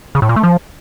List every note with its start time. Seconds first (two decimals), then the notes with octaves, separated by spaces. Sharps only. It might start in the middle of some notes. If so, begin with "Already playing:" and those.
0.15 C#3
0.22 A2
0.29 A#2
0.36 A3
0.43 F3